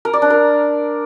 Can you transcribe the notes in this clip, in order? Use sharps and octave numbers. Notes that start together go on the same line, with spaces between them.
A#4
D5
D4
A#4